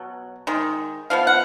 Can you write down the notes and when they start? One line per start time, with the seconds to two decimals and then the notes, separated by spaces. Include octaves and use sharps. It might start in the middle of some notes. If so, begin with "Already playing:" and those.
Already playing: B2 F#3
0.47 D#3 G#3
1.10 F3 B3 F5
1.27 F#5